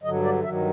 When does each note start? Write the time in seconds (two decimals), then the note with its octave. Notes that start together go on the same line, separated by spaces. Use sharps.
0.03 G2 D3 F#3 D#5
0.24 D5
0.43 G2 D#3 F#3 E5